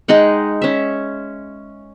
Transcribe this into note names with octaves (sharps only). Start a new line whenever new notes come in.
G#3 D#4 F#5 G5
C#4 E5